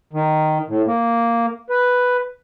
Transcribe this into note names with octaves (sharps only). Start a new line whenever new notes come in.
D#3
A2
A#3
B4